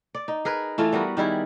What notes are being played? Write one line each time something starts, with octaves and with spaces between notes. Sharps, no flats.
D5
D#4
G#4 A#4 B4
E3 A3 F4
G3 B3 F#4 A#4
D#3 G3 E4 G#4